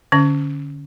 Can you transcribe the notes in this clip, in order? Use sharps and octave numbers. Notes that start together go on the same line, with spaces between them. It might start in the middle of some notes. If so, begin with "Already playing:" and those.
D3 C#4